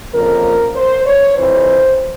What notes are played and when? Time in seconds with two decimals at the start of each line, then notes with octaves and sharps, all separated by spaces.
0.13 F2 C#3 F3 A#3 A#4
0.75 C5
1.06 C#5
1.37 F2 C3 E3 C5